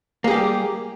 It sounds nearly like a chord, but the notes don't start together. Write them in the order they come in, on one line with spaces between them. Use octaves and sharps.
A#3 G#4 G4 G3